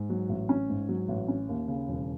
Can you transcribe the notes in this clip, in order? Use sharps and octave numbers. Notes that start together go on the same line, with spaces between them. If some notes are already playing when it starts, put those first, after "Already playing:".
Already playing: G#2
F#3
A1
C#4
G#2
F#3
A1
C#4
D#2
C#3
E1